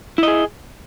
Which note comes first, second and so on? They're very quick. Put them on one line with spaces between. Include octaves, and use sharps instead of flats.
E4 D#5 G#4